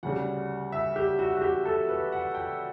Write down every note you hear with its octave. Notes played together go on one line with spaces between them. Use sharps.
D2 C#3 G3 F#5
E5
G4
F#4
F#4
G4
A4
B4
F#5
G5